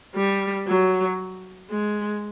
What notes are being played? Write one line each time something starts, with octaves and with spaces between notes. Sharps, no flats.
G3
F#3
G#3